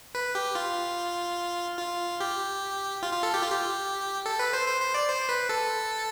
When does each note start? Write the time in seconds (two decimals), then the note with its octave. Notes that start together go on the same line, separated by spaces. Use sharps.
0.15 B4
0.35 G4
0.55 F4
1.79 F4
2.20 G4
3.03 F4
3.13 F4
3.23 A4
3.34 G4
3.42 F4
3.50 G4
4.26 A4
4.39 B4
4.53 C5
4.68 C5
4.81 C5
4.94 D5
5.08 C5
5.29 B4
5.49 A4